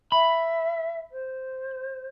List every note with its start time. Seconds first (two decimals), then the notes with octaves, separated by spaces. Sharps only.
0.12 E5 B5
1.12 C5